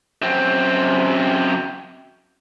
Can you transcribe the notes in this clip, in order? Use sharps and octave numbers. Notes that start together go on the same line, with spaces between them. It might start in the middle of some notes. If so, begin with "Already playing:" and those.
F#2 C4